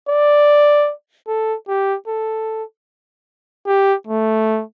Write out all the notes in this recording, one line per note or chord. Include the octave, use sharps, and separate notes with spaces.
D5
A4
G4
A4
G4
A3